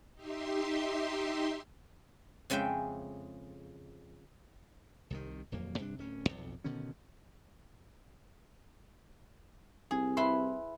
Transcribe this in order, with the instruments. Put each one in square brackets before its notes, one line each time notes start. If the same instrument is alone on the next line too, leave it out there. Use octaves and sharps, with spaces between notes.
[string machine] D#4 G4 E5 C6
[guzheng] F2 C#3 G#3 E5 G5
[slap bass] C2 C3 D#3
D#1 F2 F#3 A#3
G2 C3 C#4 D4
D1 C#4
B1 F2
B2 D3 D#3 C#4
[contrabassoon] C2 [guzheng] G#4
[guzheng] E4 B4 C6